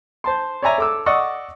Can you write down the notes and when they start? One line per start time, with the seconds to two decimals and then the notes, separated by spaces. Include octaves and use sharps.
0.24 C5 A5 C6
0.62 C#5 D5 E5 G#5 A#5
0.78 A4 D6 E6
1.06 D5 D#5 F#5 C#6 E6